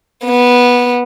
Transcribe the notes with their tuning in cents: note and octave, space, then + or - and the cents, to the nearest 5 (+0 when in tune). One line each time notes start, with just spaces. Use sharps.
B3 -10